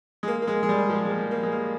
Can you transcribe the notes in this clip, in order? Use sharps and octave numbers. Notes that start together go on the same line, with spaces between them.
G#3
A#3
A#3
G#3
G#3
G3
F3
G#3
A#3
A#3
G#3
A#3